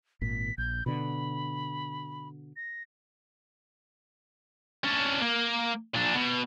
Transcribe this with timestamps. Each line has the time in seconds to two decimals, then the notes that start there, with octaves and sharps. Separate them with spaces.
0.21 G#1 A#2 B6
0.58 A#1 G6
0.86 B2 D3 B5
2.56 A#6
4.84 C#4 D4
5.22 A#3
5.95 A#2 D4
6.15 B2